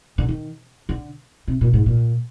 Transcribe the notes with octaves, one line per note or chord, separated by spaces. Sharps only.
D3
D#3
D3
C3
A#2
G#2
A#2